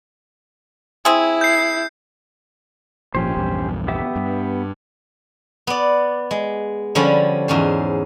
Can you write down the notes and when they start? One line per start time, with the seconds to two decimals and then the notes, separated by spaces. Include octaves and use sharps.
1.05 C4 E4 G#4
1.41 G6 C7
3.15 G#1 A#2 F3 C#4 G4 C5
3.37 A#1 E2 G2
3.88 B3 G4 E5
4.16 G2
5.67 B3 D5
6.31 G#3
6.95 D3 F3 G3 C#4 B5
7.48 E2 G#2 C#4 C5